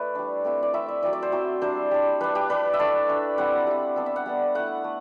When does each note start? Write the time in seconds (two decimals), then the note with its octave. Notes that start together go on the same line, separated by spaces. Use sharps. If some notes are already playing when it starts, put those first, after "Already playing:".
Already playing: A3 E4 B4 D5
0.15 G3 D4
0.44 A3 C4 E4
0.63 D5
0.73 A3 C4 E4 E5
0.88 E5
1.03 F#3 C4 E4 D5
1.13 D5
1.22 C5
1.32 F#3 C4 E4
1.61 G3 D4 C5
1.91 G3 D4
2.20 G3 D4 B4
2.35 G4
2.49 G3 D4 B4
2.73 E5
2.79 A3 D4 D5
3.08 A3 D4
3.37 G3 C4 E4 F#5
3.67 G3 C4 E4
3.96 G3 B3 D4
4.06 E5
4.16 F#5
4.26 G3 B3 D4
4.55 A3 E4 F#5
4.84 A3